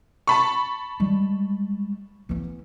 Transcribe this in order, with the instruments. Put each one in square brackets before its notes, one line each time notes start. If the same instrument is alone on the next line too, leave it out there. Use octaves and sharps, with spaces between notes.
[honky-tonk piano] A5 B5 C#6
[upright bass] G3 G#3
E3 B3